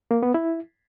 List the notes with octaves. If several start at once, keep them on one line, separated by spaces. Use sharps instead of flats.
A#3
B3
E4